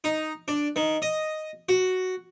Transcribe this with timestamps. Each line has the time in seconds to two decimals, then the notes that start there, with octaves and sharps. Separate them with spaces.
0.04 D#4
0.48 D4
0.76 D#3
1.02 D#5
1.69 F#4